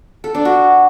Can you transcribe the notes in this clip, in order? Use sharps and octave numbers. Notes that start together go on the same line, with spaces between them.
A4
D4
F#4